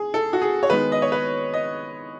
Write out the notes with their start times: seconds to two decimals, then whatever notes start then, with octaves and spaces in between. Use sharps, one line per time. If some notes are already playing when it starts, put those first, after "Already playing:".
Already playing: G#4
0.14 A4
0.33 F#4
0.42 G#4
0.63 C#5
0.70 D#3 G#3 B3 B4
0.92 D#5
1.02 C#5
1.12 B4
1.54 D#5